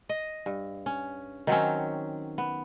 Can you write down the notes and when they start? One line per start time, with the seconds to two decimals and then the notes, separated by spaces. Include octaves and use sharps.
0.09 D#5
0.46 G2
0.86 C#4
1.47 D#3 F#3 C4 C#4
2.38 B3